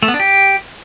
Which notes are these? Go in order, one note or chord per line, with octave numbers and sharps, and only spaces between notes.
A3
B3
D4
G4